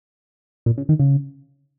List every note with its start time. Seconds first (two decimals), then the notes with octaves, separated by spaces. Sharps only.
0.66 A#2
0.78 C#3
0.89 D#3
0.99 C#3